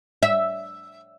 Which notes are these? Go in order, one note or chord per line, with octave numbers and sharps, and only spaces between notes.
E5